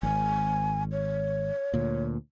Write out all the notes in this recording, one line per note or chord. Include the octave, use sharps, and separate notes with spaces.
G#1 G#5
C#5
D2 A#2